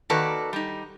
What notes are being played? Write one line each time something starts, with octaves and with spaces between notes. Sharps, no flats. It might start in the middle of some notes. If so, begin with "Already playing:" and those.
D#3 A#3 F#4 A4 B4 D5
G3 D#4